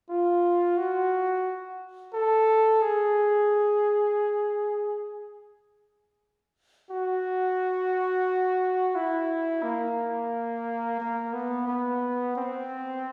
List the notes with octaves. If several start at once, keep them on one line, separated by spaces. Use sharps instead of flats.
F4
F#4
A4
G#4
F#4
E4
A#3
A#3
B3
B3
C4